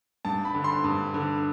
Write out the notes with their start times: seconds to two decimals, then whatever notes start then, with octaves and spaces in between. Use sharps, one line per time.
0.25 G2 A5
0.45 B5
0.55 D3
0.64 C6
0.84 G2
1.14 D3